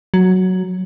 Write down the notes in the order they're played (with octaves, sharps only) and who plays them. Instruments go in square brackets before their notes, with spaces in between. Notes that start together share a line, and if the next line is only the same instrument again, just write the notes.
[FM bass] F#3